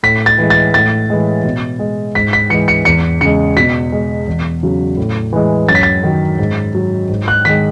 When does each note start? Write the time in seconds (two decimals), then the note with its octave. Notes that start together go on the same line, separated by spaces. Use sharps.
0.03 A2 B6
0.26 A6
0.38 E3 G#3
0.50 A6
0.74 A2 A6
1.10 E3 G#3
1.44 B2
1.79 G#3
2.15 G#2 B6
2.33 B6
2.50 E3 C#7
2.53 G#3
2.68 C#7
2.85 E2 C#7
3.21 C#3 G#3 C#7
3.57 B2 B6
3.92 G#3
4.27 E2
4.63 C#3 F#3
4.97 A2
5.33 E3 G#3
5.68 F#2 A6
5.75 B6
5.83 A6
6.03 D#3 F#3
6.39 G#2
6.75 F#3
7.09 G#2
7.28 F#6
7.45 D#3 G#3 B6